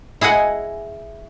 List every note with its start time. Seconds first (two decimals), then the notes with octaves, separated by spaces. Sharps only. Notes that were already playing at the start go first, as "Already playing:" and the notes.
0.21 E4 G#4 D#5 F#5 G#5